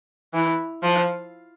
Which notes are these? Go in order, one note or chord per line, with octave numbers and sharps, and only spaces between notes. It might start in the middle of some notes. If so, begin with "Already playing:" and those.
E3
F3